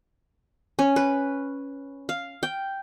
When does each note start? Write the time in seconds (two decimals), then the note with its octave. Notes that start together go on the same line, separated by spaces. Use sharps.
0.79 C#4
0.96 B4
2.09 F5
2.43 G5